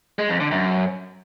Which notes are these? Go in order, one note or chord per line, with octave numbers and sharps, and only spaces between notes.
G#3
F2
D3
F#2